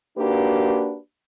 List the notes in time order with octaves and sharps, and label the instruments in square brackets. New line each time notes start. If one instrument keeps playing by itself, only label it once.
[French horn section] A#3 D4 D#4 F#4 G4 B4